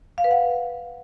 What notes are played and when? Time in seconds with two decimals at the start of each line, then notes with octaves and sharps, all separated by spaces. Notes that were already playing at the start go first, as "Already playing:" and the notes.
0.18 F5
0.24 B4
0.31 F#5